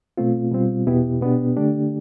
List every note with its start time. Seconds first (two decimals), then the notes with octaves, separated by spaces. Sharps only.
0.17 B2 A3 C4 F4
0.52 B2 G3 C4 F4
0.87 E2 B2 B3 E4 G4
1.21 B2 B3 D4 G4
1.56 D3 A3 D4 G4